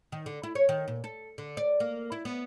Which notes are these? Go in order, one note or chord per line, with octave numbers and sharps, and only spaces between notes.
D#3
D3
E4
C#5
D#3
A#2
A4
D3
D5
A#3
E4
B3